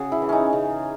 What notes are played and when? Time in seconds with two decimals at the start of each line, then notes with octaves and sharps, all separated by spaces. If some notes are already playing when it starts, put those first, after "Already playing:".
Already playing: C#3 F#4 G#4
0.12 E4
0.22 E3
0.29 C#4 D#4
0.53 C#3